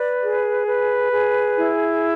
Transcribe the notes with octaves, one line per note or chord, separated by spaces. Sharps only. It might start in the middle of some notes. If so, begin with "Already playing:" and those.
Already playing: B4 D5
G#4
B4
G#4
E4